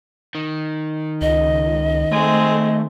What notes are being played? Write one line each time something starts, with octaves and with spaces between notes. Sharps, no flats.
D#3
C#2 D#5
G#3 A3 C4